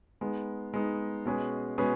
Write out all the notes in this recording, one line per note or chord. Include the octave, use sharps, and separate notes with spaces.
G#3 B3 D#4
G#3 B3 D#4
B2 G#3 C#4 G#4 B4
B2 G#3 C#4 G#4 B4